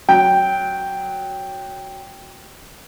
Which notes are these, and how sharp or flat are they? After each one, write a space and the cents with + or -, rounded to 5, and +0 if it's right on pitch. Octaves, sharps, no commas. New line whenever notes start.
F#3 +0 G5 +0